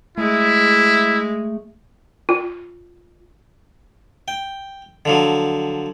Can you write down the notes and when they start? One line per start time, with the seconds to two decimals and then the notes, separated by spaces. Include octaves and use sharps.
0.18 G#3 A3 E4
2.29 F4
4.28 G5
5.05 D3 F3 F#3